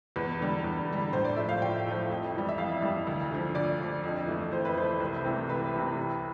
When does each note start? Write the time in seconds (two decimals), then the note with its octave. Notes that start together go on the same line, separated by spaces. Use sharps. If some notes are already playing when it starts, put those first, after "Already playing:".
0.16 E2 B4
0.40 D3 G3
0.64 E2
0.89 D3 G3
1.13 A2 C5
1.24 D5
1.36 F3 A3 E5
1.49 F5
1.62 A2 G5
1.86 F3 A3
2.10 F2
2.34 E3 G3
2.48 E5
2.58 F2 F5
2.82 E3 G3
3.07 D2
3.31 D3 F3
3.55 D2 D5
3.79 D3 F3
4.03 F2
4.27 E3 A3
4.51 F2 C5
4.65 B4
4.77 E3 A3 C5
5.00 C2
5.24 C3 E3 A3
5.48 C2 B4
5.74 C3 E3 A3
5.97 C2